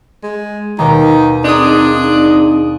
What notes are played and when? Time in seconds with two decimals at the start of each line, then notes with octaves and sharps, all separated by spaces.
0.23 G#3
0.79 D#2 B2 D#4 D7
1.44 C4 D4 D#4 G#4 D#6